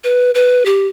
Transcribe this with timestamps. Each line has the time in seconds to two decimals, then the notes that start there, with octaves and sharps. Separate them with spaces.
0.04 B4
0.35 B4
0.66 G4